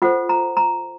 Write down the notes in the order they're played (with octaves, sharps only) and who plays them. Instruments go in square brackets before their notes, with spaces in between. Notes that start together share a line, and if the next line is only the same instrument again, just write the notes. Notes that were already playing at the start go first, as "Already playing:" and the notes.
[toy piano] F4 A4 C5 F#5
A#5
A#5